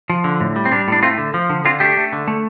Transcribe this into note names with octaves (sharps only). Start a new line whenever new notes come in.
F3
D3
A2
G3
C4
G3 D4
A2 D4
A3 C4 F4
D3
F3
D3
D3 C4 F4
A3 D4 G4
A3
D3
A3